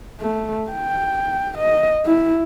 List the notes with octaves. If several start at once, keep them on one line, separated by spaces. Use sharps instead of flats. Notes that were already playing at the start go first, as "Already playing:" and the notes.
A3
G5
D#5
E4